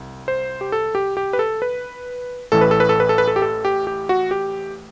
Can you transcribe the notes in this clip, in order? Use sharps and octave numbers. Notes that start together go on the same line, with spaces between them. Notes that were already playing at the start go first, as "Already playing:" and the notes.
Already playing: C2
C5
G4
A4
G4
G4
B4
A4
B4
A1 A2 E3 A4
B4
A4
B4
A4
B4
A4
B4
A4
G4
A4
G4
G4
F#4
G4